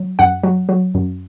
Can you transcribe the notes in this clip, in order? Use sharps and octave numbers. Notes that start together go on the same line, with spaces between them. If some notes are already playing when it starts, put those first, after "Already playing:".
Already playing: F#3
F#2 F#5
F#3
F#3
F#2